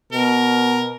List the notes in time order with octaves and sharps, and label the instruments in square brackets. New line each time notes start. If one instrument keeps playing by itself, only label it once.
[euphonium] B2 [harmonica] A#4